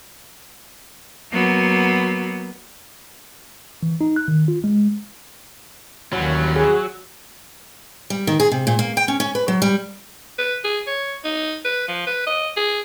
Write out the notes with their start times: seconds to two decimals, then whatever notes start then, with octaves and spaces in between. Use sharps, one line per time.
1.33 F#3 A#3 B3
3.83 E3
4.01 D#4
4.16 F#6
4.28 D#3
4.48 F4
4.64 G#3
6.13 D#2 D#3 E3 F#3 G3 C#4
6.56 G#4
8.10 G3
8.27 D#3
8.40 G#4
8.51 C3
8.67 A#2
8.79 A#3
8.97 G5
9.08 C#4
9.20 C#4
9.35 B4
9.48 F#3
9.62 G3
10.39 B4
10.64 G#4
10.87 C#5
11.25 D#4
11.65 B4
11.88 F3
12.07 B4
12.26 D#5
12.56 G#4